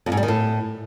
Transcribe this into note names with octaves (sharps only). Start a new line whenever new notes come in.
F2
G#2
G3
D#3
A2